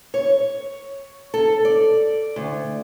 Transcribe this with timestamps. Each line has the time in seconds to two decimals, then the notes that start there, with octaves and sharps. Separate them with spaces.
0.14 C#5
1.34 A4
1.65 D5
2.36 D2